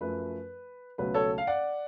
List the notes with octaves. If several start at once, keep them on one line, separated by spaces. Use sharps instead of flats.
F#2 F3 A3 B4
C#2 B2 F#3 A3 B4
A4 C#5
F5
D5 F#5